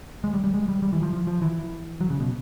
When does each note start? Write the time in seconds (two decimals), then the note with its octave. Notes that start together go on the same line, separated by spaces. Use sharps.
0.24 G#3
0.34 G3
0.44 G3
0.54 G#3
0.69 G3
0.82 G3
0.93 E3
1.02 F3
1.13 F3
1.27 F3
1.42 E3
2.01 F#3
2.10 C#3
2.20 B2